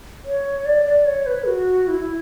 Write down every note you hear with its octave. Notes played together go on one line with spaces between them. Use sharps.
C#5
D5
D5
C#5
B4
F#4
E4